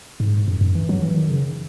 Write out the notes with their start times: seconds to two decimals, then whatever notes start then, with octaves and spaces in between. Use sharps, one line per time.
0.20 G#2
0.48 F#2
0.61 F#2
0.75 E3
0.89 F#3
1.02 E3
1.16 D#3
1.30 C#3